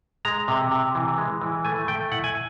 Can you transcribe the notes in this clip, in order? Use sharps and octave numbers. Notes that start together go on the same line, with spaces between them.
G#3 A#5
C3
C3
E3
G#3
E3
A3 G#5
A3 G5
E4 F#5
G#5